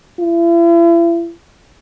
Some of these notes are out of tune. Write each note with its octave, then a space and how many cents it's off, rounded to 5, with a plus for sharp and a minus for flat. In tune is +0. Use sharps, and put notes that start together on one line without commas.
E4 +40